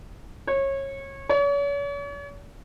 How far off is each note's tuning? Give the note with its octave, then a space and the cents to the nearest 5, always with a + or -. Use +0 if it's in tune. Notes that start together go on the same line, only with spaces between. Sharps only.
C#5 -25
C#5 +40